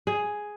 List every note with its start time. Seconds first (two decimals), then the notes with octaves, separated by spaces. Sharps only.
0.07 G#4